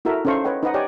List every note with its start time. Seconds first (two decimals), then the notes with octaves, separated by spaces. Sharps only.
0.05 E4 F#4 A4 A#4 E5
0.25 C#4 D#4 A4 C5 F5 C#6
0.44 B4 C#5 D#5 F#5 G5
0.63 D#4 B4 C5 D#5 F#5 D#6
0.74 G4 C#5 D5 G5 G#5